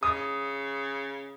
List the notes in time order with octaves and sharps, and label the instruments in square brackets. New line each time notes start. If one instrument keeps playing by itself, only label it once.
[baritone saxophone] C#3 [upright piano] D#6